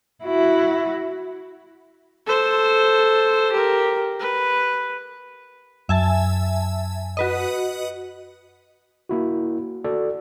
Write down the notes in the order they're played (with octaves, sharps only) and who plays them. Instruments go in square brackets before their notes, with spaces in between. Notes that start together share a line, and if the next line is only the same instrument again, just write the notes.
[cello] E4 F#4
[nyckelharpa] A4 C5
G4 A#4
B4
[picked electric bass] F#2 [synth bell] E5 G#5 A5
[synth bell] F#4 B4 D#5
[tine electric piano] A#3 E4 F#4
F#4 A4 D5